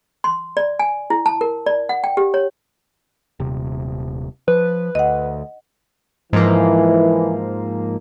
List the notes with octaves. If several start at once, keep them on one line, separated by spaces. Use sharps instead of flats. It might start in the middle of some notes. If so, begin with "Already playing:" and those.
C6
D5
G#5
E4
A5
A#4
D5
F#5
G5
G4
C#5
D#1 C3
F3 B4
D2 D#5 F#5
G#2 E3 F3 A#3